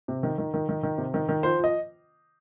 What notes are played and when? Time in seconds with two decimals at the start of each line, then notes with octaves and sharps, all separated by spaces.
0.08 C3
0.23 D#3
0.38 D#3
0.54 D#3
0.69 D#3
0.83 D#3
0.98 C3
1.14 D#3
1.29 D#3
1.43 F3 C5
1.59 F3
1.64 D#5